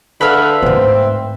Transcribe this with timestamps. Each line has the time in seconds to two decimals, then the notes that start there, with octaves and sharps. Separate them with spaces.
0.21 D3 B4 E5 F5
0.62 G#2 A3 C4